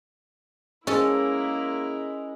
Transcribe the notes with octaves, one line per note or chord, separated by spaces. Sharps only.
G#3 A#3 C#4 E4 A4 A#4